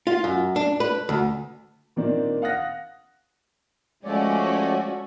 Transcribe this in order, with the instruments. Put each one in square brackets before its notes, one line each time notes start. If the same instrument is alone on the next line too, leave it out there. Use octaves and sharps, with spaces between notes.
[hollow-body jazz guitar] F4
F#2
D4
B4
D2
[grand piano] A#2 D#3 A#3 C4 D4
F5 F#5 D#6 F#6 A#6
[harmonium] F3 A3 D5 [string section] G#3 C#4 F#4